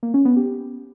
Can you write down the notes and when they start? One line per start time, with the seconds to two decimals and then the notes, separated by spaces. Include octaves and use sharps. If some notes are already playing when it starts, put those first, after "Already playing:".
0.03 A#3
0.14 C#4
0.25 B3
0.37 G4